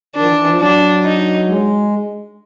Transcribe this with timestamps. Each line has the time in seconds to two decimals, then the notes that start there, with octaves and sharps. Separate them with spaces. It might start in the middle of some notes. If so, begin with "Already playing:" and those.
0.16 D#3 D4
0.21 F3
0.27 E3
0.38 E3
0.49 F3
0.60 F#3 D4
1.05 D#4
1.48 G#3